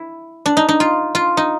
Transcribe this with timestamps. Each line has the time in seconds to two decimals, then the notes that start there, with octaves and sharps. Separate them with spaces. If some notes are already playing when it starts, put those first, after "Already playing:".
Already playing: E4
0.46 D4
0.57 D#4
0.69 D#4
0.80 F4
1.15 F4
1.37 D#4